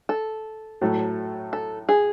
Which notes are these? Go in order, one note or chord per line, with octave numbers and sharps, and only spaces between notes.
A4
A2 F#3 A3
A4
G#4